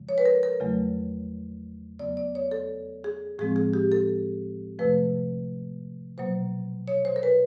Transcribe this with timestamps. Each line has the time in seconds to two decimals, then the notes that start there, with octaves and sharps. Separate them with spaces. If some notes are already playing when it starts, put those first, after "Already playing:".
Already playing: F2 C#3 F3 G#3
0.09 C#5
0.18 B4
0.26 A#4
0.43 A#4
0.60 E2 C#3 F#3 A3
1.99 F2 C#3 F#3 B3 D5
2.17 D5
2.35 C#5
2.51 A4
3.04 G#4
3.39 A2 F3 G#3 C4 G#4
3.56 G#4
3.74 G4
3.92 A4
4.79 F2 C3 F3 A3 B4
6.18 B2 F#3 A#3 C5
6.88 C#5
7.05 C5
7.16 A#4
7.23 B4